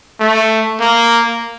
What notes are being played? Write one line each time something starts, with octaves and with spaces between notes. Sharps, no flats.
A3
A#3